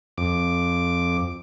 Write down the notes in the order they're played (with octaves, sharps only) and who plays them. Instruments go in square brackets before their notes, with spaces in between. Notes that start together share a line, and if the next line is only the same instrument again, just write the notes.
[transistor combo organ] F2 D6